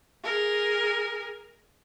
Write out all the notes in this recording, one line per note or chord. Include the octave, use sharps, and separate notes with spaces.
G#4 A#4